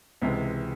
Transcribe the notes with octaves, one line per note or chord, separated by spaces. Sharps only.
C#2 C3 E3 G#3